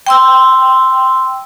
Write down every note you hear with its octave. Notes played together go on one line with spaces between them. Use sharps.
G5 C6 E6